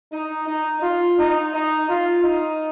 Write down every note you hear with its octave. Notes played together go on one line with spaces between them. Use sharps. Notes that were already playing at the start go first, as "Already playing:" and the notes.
D#4
D#4
F4
D#4
D#4
F4
D#4